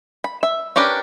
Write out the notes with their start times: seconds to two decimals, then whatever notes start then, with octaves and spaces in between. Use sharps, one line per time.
0.24 B5
0.43 E5
0.76 C#4 D4 G4 A#4 B4